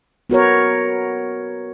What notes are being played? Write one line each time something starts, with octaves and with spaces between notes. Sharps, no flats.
B3 F#4 A#4 C#5